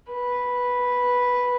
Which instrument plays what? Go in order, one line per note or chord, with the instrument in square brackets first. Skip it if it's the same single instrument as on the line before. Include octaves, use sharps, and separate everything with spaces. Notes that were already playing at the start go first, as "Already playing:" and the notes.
[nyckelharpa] B4